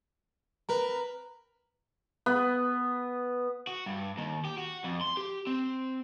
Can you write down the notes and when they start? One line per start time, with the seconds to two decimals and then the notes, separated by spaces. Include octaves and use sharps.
0.69 C4 A#4 B4 A#5
2.26 B3
3.67 F#4
3.86 G2
4.18 D#2
4.45 G4
4.58 F#4
4.84 F2
5.01 C6
5.17 G4
5.47 C4